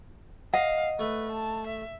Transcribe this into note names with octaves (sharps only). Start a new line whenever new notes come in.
D#5 F5 F#5
A3 B4
A5
E5